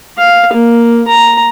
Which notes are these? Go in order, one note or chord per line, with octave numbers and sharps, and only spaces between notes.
F5
A#3
A#5